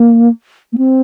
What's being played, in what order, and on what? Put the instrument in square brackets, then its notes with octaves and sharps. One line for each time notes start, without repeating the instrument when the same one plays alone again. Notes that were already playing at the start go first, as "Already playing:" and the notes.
Already playing: [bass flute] A#3
A#3
C4